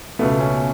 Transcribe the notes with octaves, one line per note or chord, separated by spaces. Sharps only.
C#2 B2 A3 B3
C#4